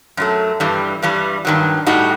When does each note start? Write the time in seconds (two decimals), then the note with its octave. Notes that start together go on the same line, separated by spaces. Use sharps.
0.17 F#2 F#3 A3
0.60 G2 E3 G3
1.02 G2 E3 G3
1.45 G2 D#3 F#3
1.86 A2 G3 D#4 F#4